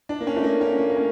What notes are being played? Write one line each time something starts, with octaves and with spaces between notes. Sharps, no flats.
D4
A#3
C#4
A3
A#3
C#4
A#3
A#3
C#4